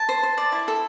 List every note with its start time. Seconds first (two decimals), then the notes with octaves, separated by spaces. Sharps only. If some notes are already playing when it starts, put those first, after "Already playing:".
Already playing: A5
0.09 C5
0.23 C5
0.38 D5
0.52 E4
0.68 A4